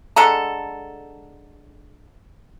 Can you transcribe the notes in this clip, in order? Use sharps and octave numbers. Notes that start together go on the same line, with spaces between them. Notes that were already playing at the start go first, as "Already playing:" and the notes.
D3 G#3 A4 A#5